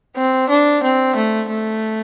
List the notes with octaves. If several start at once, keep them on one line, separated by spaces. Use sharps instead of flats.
C4
D4
C4
A3
A3